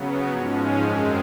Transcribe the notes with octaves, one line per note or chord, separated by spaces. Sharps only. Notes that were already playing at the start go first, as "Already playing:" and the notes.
Already playing: C#3 F#3 B3
G#2 F3 G#3 C#4
F#2 D#3 G#3 C4